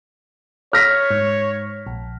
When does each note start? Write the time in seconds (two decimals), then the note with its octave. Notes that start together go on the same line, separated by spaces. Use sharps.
0.73 C#5 F6 A#6 B6
1.11 G#2
1.87 A#1